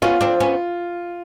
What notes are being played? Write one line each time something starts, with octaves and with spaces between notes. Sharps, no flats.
B3 C#4 F4
C4 D4
B3 C#4